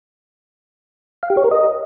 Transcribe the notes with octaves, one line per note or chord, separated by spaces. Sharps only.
F5
G4
C#5
A#4
D#5